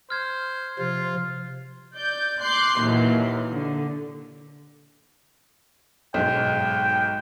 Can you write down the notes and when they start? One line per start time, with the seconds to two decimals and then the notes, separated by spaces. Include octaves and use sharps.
0.10 C5 F6 G#6
0.79 C3 F3 F4
1.95 D5 G6
2.40 C6 D6 F#6 G6 C7
2.80 D#2 A#2 E3 F#3
3.52 D3
6.14 B1 G#2 G5